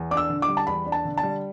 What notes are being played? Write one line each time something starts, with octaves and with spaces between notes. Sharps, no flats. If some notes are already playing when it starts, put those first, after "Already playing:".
Already playing: E2
D4 D6
E6
D3
D6
G3
A5
E2 B5
D4
A5
D3
A5
G3